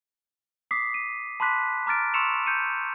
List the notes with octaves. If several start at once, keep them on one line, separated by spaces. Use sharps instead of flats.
D6 D#6 B6 C7
D#7
A5 B5 C6 D6 F#6 B6
A#5 D6 F6 A6 D7
C6 C#6 E6 C#7 E7 F7
G6 C#7 D#7